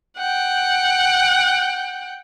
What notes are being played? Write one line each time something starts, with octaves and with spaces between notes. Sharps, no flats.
F#5 G5